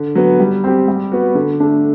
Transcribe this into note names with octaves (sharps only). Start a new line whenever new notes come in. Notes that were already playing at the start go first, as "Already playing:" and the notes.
Already playing: D3
F#3 B3
G3
C4 G4
G3
B3 F#4
D3
A3 D4